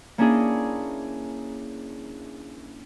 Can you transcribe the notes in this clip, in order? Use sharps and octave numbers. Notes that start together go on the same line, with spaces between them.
A#3 C#4 D4 E4 G#4